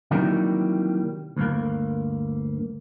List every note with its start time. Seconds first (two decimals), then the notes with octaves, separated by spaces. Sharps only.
0.11 C3 D#3 E3 F#3 G3 A#3
1.37 D2 G2 A#3